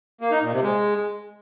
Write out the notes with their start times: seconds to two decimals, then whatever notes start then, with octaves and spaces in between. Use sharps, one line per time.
0.21 A#3
0.31 D#4
0.42 A#2
0.52 C3
0.63 G#3